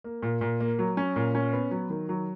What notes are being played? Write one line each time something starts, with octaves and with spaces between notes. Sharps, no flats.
A#3
A#2
A#2
A#3
F#3
C#4
A#2
C#4
B3
F#3
D#3
F#3